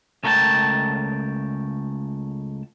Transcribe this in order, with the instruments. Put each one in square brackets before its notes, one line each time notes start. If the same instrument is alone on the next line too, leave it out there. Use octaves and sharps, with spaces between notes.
[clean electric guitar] C#2 A3 A#4 F5 G5 A5